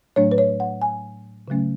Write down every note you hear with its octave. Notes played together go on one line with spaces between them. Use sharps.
A2 F#3 A3 D4 C#5
B4
C#5
F#5
G#5
C#3 F#3 A3 C#4